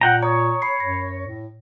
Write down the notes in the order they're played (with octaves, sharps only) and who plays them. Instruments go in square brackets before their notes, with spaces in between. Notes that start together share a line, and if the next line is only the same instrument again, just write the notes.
[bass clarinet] A#2 [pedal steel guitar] F#5 G5 A#5
[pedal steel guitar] C#5 [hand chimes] A#5 D#6
[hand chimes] B5 C7
[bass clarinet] F#2 [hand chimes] A#6
[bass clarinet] A2